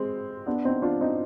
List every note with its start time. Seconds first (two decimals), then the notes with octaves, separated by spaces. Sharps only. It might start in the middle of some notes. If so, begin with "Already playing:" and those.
Already playing: G#3 C4
0.47 B3 D4
0.64 C4 D#4
0.82 D4 F4
1.01 C4 D#4